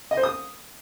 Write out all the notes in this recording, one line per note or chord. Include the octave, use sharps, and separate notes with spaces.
D#5
C5
D#6